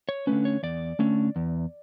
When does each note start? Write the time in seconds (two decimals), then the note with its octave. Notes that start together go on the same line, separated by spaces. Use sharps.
0.09 C#5
0.27 D3 A3 C#4 B4
0.45 C#5
0.63 E2 D5
0.99 D3 A3 C#4
1.36 E2